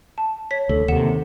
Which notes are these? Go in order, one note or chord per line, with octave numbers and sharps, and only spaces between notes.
A5
C#5 B6
D2 A4
D#2 C3 F#5 E7